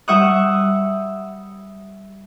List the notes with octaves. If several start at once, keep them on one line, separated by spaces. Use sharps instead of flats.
G3 E5 F#5 C#6 D#6 F#6